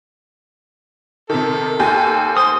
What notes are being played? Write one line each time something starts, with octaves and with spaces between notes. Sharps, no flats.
C3 D#3 A4
D#2 G4 G#5
C5 D#6